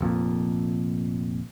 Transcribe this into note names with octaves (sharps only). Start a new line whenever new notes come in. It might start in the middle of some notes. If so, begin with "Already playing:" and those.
F1 F2 A#2